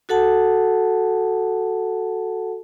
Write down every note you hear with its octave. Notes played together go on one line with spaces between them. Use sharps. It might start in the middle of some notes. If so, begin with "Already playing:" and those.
F#4 A4 F#5 A5